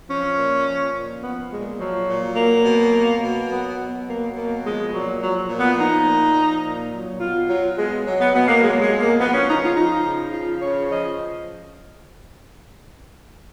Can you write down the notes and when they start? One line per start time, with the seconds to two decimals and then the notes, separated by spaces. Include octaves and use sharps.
0.08 F3 C#4
0.37 A#2
0.65 F3
0.94 A#2
1.22 F3 B3
1.51 A#2 G#3
1.79 F3 F#3
2.08 A#2
2.36 F#3 A#3
2.64 B2
2.93 F#3
3.21 B2
3.49 F#3 B3
3.78 B2
4.06 F#3 A#3
4.35 B2 A#3
4.63 F3 G#3
4.92 A#2 F#3
5.20 F3 F#3
5.49 A#2
5.59 B3
5.78 F3 D#4
6.06 A#2
6.35 F3
6.63 A#2
6.91 F#3
7.19 B2 F4
7.48 F#3 F4
7.76 B2 G#3
8.05 F#3
8.20 B3
8.33 B2 B3
8.48 A#3
8.62 F#3 G#3
8.81 G#3
8.90 B2
8.99 A#3
9.18 F3 B3
9.33 C#4
9.47 C#3 D#4
9.61 F4
9.75 F3 D#4
10.05 C#3
10.32 F3 F4
10.61 C#3 C#5
10.89 F3 D#5